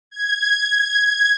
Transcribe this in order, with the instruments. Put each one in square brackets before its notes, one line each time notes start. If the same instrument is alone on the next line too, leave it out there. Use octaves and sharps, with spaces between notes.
[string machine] G#6